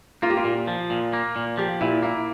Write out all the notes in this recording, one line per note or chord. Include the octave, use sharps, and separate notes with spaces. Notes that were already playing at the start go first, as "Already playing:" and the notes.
A#3 F4
G4
F4
A#2
F3
A#2
A#3
A#2
F3 G4
A#2 E4
A#3 E4